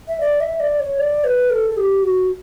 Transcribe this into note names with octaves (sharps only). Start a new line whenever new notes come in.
E5
D5
E5
D5
C#5
D5
B4
A4
A4
G4
F#4